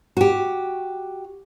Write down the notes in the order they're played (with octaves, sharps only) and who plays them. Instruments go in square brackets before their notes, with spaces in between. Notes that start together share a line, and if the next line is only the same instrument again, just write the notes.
[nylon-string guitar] F#4 G4